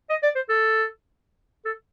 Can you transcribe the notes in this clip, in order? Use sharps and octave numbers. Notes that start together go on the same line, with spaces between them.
D#5
D5
C5
A4
A4